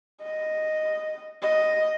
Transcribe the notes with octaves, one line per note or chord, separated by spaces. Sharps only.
D#5
D#5